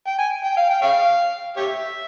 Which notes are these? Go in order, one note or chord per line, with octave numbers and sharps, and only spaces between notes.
G5
G#5
G5
F5
G5
C#5 F5
G4 C#5 E5